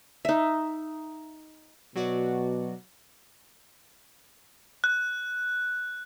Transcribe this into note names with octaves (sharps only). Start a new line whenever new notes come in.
D#4 E5
B2 F#3 F#4 D5
F#6